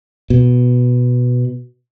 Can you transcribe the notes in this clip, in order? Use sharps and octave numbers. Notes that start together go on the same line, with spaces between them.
B2